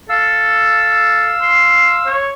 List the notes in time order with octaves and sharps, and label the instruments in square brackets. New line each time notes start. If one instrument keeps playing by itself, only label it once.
[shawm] A4 [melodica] F5 E6
[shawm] C6
C#5